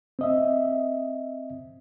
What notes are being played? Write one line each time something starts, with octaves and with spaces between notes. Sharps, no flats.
C4 D#5 E5